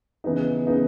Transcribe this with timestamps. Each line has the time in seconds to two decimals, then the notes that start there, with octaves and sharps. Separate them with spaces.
0.24 C#3 E3 B3 D#4
0.67 C#3 E3 B3 D#4